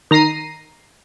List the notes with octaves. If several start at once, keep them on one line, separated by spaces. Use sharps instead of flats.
D#3 A#5 A#6 C7 D#7